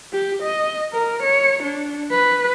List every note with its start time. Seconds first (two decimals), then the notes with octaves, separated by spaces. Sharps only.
0.13 G4
0.43 D#5
0.92 A#4
1.23 C#5
1.63 D4
2.11 B4